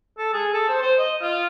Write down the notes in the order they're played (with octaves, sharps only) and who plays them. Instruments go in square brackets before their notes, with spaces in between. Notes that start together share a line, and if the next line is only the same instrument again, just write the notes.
[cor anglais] A4
G#4
A4
C5
C5
D#5
F4